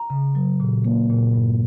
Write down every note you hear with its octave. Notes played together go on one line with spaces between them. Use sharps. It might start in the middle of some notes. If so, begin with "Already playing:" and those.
Already playing: A#5
C#3
F#3
A#2
A#3
A#2
G2